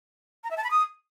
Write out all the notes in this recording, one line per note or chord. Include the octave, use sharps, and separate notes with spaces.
A#5
E5
A5
B5
D#6